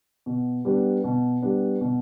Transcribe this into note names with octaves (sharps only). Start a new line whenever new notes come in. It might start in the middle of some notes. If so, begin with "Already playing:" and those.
B2
G3 B3 D4
B2
G3 B3 D4
B2